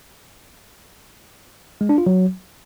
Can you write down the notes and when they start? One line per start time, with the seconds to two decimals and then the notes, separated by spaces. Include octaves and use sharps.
1.81 G#3
1.89 D4
1.98 F4
2.06 F#3